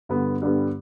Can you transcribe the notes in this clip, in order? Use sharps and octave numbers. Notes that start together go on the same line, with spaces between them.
G2 D3 G3 B3
G2 D3 G3 B3